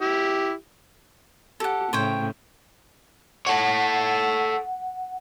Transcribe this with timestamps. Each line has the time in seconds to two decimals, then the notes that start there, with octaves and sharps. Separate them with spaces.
0.01 E4 G4
1.60 G4 A4 F#5
1.93 A2 C#3 C5 C#5 G5
3.47 A4 C#5 F#5